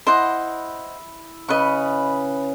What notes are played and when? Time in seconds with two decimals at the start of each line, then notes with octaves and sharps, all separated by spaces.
0.07 E4 C5 D#5 F#5
1.48 C#3 B4 D#5 B5 C#6